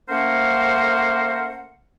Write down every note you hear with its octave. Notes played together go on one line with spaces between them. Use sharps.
A3 A#3 C#4 A#4 C5 F#5